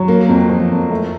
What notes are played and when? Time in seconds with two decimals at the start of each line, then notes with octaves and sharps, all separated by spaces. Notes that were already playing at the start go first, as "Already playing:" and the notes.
Already playing: F#3
0.08 A#3
0.29 F2
0.49 F3
0.70 F2
0.91 A3